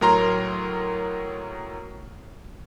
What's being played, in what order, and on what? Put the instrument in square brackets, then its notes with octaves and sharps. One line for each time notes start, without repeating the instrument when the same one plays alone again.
[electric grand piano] A2 F#3 A#4 A#5 C6